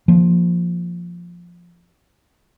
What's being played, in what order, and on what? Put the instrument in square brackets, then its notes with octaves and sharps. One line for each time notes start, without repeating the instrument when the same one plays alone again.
[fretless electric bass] F3 A#3